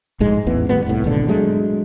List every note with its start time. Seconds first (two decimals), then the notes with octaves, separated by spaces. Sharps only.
0.20 A#1 G#2 G#3
0.46 A1 E2 E3 B3
0.69 D#2 A2 G3 B3
0.87 C2 A2
1.04 G#1 B2 D3
1.28 F#3 G#3 A3 D4